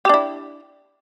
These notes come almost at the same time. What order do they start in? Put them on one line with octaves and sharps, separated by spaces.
G4 D4 E4